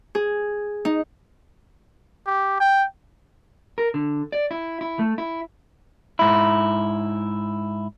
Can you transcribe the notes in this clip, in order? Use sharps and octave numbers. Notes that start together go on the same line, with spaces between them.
G#4
D#4
G4
G5
A#4
D3
D5
E4
E4
A3
E4
G#2 E4